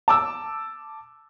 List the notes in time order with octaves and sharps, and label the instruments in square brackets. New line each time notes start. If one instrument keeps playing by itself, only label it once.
[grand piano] A5 D6 E6